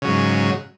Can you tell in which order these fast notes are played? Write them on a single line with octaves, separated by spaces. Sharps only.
C#3 F#3 G#2